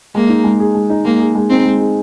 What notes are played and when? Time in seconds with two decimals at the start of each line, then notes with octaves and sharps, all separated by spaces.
0.15 G#3 A#3
0.29 D#4
0.44 G#3
0.60 G#4
0.75 G#3
0.90 D#4
1.05 G#3 A#3
1.20 G#4
1.35 G#3
1.50 C4 D#4
1.66 G#3
1.80 G#4